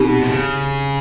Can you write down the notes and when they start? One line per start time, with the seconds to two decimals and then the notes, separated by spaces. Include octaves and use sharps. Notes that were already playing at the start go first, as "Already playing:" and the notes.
Already playing: B2 C4 D#4 G4
0.21 C3
0.29 C#3